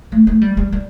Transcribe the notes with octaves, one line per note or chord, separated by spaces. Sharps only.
A3
A3
G3
G3
G3